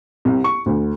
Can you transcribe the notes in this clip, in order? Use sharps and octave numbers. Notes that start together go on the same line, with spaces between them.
C2
C#6
D2